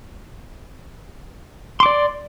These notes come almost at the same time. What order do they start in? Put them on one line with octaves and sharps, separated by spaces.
C6 D6 D5